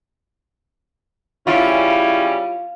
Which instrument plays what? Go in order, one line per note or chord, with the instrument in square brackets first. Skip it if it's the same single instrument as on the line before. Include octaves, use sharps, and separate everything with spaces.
[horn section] C#3 G3 C#4 [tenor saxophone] E4 [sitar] F4